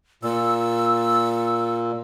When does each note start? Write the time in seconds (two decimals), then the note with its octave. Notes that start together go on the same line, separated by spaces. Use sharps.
0.23 A#2 E6